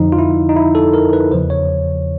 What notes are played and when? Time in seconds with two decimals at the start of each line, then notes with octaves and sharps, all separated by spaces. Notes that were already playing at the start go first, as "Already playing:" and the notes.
Already playing: F2 D3 F3 D#4
0.12 F4
0.19 E4
0.49 D#4
0.57 E4
0.75 A4
0.94 A#4
1.13 B4
1.32 E2 C#3 F3 C5
1.50 C#5